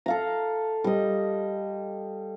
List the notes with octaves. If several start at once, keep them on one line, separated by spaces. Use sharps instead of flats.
A4 F5 A#5
G3 D#5